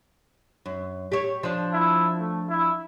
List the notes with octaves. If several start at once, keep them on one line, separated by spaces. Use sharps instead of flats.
F#2
G4 C#5
F3 D4
E4
A3
E4